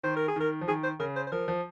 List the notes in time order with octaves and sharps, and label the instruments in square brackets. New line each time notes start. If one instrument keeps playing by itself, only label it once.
[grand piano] D#3 [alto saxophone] C5
[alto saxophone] A#4
G#4
[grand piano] D#3 [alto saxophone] A#4
[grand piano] F3
[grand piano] D#3 [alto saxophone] G#4
[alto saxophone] C5
[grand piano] C#3 [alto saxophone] A#4
[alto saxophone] C5
C5
[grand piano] F3 [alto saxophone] A#4
[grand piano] F3